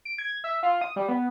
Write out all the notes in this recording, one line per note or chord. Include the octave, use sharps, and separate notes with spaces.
D7
G#6
E5
F4
D#6
G3
B3